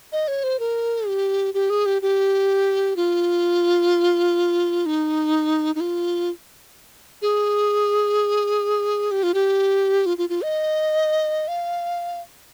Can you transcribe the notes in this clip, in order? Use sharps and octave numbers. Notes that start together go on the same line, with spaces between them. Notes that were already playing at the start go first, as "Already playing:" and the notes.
D#5
C#5
C5
A#4
G4
G4
G#4
G4
G4
F4
D#4
D#4
F4
G#4
G4
F4
G4
F4
F4
F4
D#5
F5